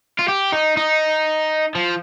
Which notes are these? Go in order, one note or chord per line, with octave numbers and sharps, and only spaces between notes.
F4
G4
D#4
D#4
F3